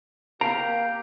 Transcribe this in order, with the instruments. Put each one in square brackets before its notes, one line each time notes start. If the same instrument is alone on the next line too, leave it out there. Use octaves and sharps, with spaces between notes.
[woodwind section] A#3 G4 [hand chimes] F5 C7 D7 [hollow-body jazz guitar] A#5